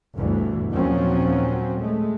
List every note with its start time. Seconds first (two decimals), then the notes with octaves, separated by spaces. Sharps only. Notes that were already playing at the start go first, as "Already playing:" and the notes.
0.17 G1 D2 G2 B2 E3
0.70 D#2 A#2 F3 F#3 C4 C#4
1.79 G#3 A3